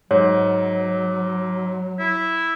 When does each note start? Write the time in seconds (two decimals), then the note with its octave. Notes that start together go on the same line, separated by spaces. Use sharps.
0.11 G#2 F#3 C#5
1.99 E4